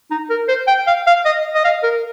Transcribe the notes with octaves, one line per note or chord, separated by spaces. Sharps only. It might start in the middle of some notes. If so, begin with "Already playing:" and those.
D#4
A#4
C5
G5
F5
F5
D#5
D#5
F5
A#4